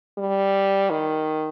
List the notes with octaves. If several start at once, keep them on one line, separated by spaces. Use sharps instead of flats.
G3
D#3